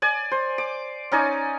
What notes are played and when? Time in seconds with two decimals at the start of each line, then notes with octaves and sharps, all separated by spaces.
0.02 D5 G#5
0.31 C5
0.58 D6
1.12 C#4 D#4 D5 G#5